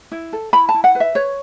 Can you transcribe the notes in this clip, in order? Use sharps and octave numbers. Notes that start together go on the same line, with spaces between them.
E4
A4
E4 B5
A5
E4
F#5
B4
E5
B4 C#5